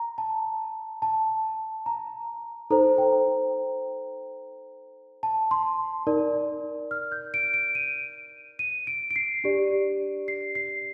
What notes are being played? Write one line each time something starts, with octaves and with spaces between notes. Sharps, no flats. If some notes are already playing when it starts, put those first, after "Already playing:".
Already playing: A#5
A5
A5
A#5
D#4 A4 C5 A#5
G5
A5
C6
D#4 A#4 D5
F6
G6
D7
D7
D#7
D#7
D7
D7
C7
D4 G4 D5
C7
C7